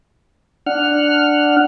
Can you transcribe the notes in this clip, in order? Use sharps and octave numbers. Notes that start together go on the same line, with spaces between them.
D4 F#5 F6